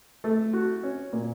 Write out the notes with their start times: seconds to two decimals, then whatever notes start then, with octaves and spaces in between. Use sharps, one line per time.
0.24 A3
0.53 F#4
0.83 C#4
1.13 A#2